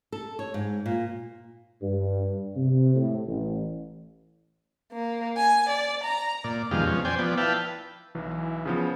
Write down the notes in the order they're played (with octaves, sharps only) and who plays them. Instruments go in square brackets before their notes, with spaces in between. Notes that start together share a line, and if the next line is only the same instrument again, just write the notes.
[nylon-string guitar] A4
C#5
G#2
A#2
[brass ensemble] G2
C3
A2
A1
[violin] A#3
G#5
D5
A#5
[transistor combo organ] A#2 D5
F2 B2 D#3 G#3 G4 F5
B2 F3 C#4
C5 D5 G5 G#5
F3 B3 D5
E4 B4 F5 G5 A5
[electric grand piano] B1 [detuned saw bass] E3
[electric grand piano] C#3 F3 B3